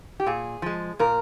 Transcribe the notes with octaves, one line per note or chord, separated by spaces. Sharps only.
G4
A#2 G#4
F3 G#3
A#2 A#4